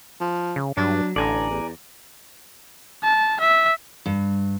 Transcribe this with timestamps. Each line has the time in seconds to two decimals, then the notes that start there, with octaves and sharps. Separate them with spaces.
0.21 F3
0.56 C#3
0.77 G2 F#3 D4
1.16 A1 D3 D5 G#5 A#5
1.50 E2
3.03 A5
3.40 E5
4.06 G2